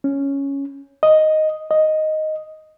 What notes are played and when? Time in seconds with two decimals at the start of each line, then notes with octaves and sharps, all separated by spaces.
0.04 C#4
1.03 D#5
1.71 D#5